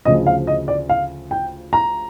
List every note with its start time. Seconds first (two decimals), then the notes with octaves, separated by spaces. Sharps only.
0.05 D2 C#3 F3 D#5
0.27 F5
0.47 D#5
0.68 D5
0.89 F5
1.31 G5
1.73 A#5